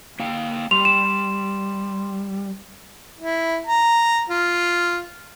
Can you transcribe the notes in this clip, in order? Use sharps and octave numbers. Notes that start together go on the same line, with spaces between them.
A#3 F5 G5
G3 C6 F7
E7
E4
A#5
F4